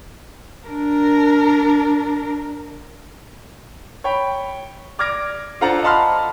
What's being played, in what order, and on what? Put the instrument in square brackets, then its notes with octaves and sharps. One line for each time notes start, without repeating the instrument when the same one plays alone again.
[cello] D4 A#4
[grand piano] C#5 G5 B5
D5 D6 F6 G#6 A#6 D7
D4 F4 A4 C5 F#5 A#5
D#5 F5 A5 B5 C6 F6